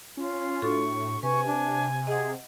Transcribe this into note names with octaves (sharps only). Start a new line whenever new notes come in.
C#4 F4
A2 D4 F#4 A4 C#6
C3 B4 G#5 C#6
D4
G#4 D#5 F#5